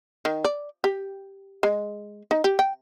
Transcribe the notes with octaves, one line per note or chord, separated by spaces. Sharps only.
D#3
D5
G4
G#3
D#4
G4
G5